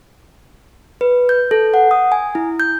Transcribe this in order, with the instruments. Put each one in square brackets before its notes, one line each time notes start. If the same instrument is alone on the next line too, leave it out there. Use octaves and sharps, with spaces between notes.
[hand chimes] B4
G6
A4
F#5
D#6
G#5
E4
G6